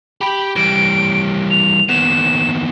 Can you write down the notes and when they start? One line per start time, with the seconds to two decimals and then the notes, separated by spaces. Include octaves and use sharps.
0.21 G4 G5 B5
0.56 E3 G3 D7
1.51 F7
1.89 D#2 B3 E7